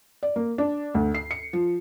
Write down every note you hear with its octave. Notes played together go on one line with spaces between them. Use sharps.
D5
A#3
D4
D2
C7
C#7
F3